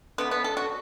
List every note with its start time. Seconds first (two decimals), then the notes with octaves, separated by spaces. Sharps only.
0.18 D3 A3 B3
0.31 B3
0.44 A4
0.57 F#4